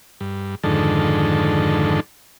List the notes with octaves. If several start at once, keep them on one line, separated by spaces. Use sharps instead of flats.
G2
F2 G#2 D3 D#3 A4